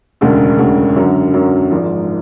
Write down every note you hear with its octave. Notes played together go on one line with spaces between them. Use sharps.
E1 D2 C#3
E1 D2 C#3
F#2 D3 F#3
F#2 D3 F#3
G#1 G#2 F3